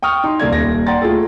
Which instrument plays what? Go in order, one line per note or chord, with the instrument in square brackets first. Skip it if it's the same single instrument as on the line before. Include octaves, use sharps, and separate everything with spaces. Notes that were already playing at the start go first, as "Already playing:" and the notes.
[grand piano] G5 C#6 D#6 F6
D#4 C6
C2 A#3 A4 D5 G#6
D#1 A#6
D5 F#5 G5 A#5 C6 A6
A3 F4 G#4 A4